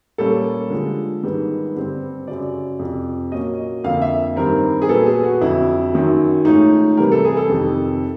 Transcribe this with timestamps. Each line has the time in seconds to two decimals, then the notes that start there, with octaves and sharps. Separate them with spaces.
0.18 A#2 G3 A#3 C#4 A4
0.70 D3 F3 G#3
1.23 G#2 D#3 G3 B3
1.75 G2 D3 G3 C4
2.27 F#2 C#3 F#3 D5
2.79 F2 C3 F3
3.32 A#2 F#3 A#3 C#4 D#5
3.84 F2 D3 F3 A#3 F5
4.02 E5
4.36 G2 D#3 G3 C4 A#4
4.82 G#4
4.89 A#2 F#3 B3 A4
5.06 G#4
5.24 F#4
5.41 F2 D3 F#3 E4
5.93 F#2 D#3 F#3
6.45 G#2 F3 A3 C#4 D#4
6.97 C3 E3 G3 A#4
7.12 A4
7.25 G#4
7.37 A4
7.50 F2 C3 D#3